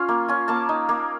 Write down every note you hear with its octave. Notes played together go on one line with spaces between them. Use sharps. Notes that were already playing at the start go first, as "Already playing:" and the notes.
Already playing: C#4 F4 F5
A#3
C#4 F4
A#3 A5
D#4
A#3